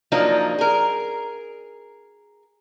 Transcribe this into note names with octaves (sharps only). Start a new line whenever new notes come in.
F3 F#3 A#3 D4 D#4
G#4 A#4